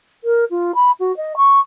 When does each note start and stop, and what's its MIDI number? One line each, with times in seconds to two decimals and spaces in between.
0.24 0.45 70
0.51 0.72 65
0.75 0.91 83
1.00 1.15 66
1.17 1.36 75
1.37 1.60 85